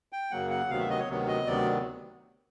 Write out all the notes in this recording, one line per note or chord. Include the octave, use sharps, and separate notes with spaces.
G5
F#2 C#3 F#3 A#3 F#5
F#5
D2 C3 D#3 F#3 B3 F5
E5
D#5
C#5
D2 C3 D#3 F#3 B3
D#5
D2 C3 D#3 F#3 B3 D5